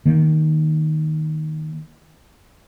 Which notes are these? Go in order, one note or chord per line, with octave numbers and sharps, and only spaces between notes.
D#3 A#3